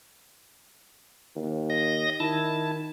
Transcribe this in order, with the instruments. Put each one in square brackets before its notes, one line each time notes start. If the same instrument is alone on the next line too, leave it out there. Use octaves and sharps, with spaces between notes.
[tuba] D#2
[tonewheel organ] D#5 A#6
[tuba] D#3 [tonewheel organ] E4 A5